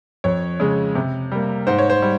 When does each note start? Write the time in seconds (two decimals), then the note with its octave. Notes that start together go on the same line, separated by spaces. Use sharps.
0.24 F2 C#5
0.60 C#3 G#3
0.95 C3
1.32 G3 A#3
1.67 G#2 C5
1.78 C#5
1.90 C5
2.02 G3